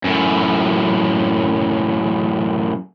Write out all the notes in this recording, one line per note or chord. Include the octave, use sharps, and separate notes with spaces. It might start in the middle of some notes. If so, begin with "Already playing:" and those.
F#2 A2